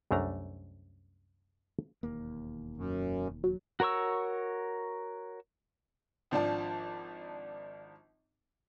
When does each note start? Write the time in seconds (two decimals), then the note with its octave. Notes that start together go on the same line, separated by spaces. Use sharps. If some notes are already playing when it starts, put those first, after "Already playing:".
0.11 C2 F#2 A3 D4 A#5
2.03 E1 D#2 A#3
2.77 F#2
3.44 F#3
3.80 F#4 A#4 C#5 C#6 E6
6.31 G#1 F3 D4 A5